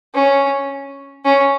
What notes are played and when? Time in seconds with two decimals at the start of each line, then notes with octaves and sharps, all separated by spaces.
0.15 C#4
1.25 C#4